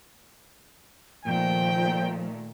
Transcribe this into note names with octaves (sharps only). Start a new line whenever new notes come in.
A#2 D#3 F3 A3 G5